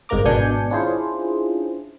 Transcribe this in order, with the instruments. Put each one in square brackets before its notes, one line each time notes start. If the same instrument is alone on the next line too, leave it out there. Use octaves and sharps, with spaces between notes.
[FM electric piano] G1 G#2 C3 A#3 A#5 D6
G#1 B2 D4 G#5 G6 C#7
C#4 D4 E4 F4 G#4 C5